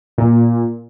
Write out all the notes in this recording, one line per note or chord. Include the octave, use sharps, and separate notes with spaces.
A#2